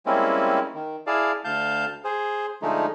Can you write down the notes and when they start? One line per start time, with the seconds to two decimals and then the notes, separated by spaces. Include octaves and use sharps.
0.06 G3 G#3 A#3 C4 C#4 E4
0.75 D#3
1.07 E4 G#4 D5 F5 A5
1.45 D2 F5 A5 G6
2.05 G#4 C5
2.62 D3 F3 G#3 A3 D#4